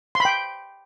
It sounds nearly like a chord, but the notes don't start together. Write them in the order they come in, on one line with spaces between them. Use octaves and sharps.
C6 B5 G5